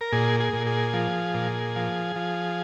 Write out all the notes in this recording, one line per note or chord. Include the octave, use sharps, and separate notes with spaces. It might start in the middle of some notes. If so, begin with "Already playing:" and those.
A#4
A#2 G#4
G#4
A#2
G#4
F3
A#2
F3
F3